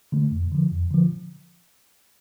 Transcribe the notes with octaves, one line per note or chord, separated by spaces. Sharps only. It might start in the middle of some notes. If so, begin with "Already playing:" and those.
D3 A3
F2
D3 F3
F2
D3 F3